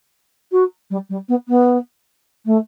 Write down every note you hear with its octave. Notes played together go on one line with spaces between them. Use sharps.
F#4
G3
G3
B3
B3
A3